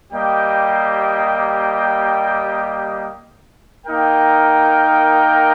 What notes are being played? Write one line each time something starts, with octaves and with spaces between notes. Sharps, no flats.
G3 A#3 G4 D#5 G5
A#3 D#4 A#4 G5